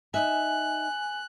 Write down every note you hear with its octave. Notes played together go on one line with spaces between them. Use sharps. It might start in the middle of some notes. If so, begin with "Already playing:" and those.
D#4 E5 G#5 F#6